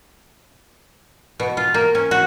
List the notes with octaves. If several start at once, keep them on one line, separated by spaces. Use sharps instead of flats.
B2
F4
A#3
C#4
F#4